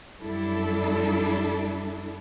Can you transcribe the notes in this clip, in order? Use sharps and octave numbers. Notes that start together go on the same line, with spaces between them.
F#2 G3 D4 E4 A4